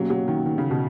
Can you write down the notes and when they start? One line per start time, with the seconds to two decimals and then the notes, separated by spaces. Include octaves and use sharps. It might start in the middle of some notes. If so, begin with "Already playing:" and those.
Already playing: B2 F#3 A#3 C#4
0.10 F#3
0.28 D#3
0.46 D#3
0.58 C#3
0.71 B2